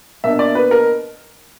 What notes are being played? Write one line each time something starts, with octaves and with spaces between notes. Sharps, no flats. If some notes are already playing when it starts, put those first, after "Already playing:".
B2 A#3 D4 E5
D5
B4
A#4